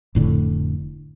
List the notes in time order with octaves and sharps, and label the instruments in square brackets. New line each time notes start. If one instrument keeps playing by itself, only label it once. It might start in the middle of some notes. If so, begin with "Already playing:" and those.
[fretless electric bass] F1 A2 D3